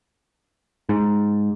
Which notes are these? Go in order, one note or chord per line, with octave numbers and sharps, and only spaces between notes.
G#2